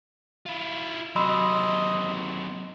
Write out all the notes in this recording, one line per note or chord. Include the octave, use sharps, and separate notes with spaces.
E4 F4
C3 F#3 D#5 B5 C6 E6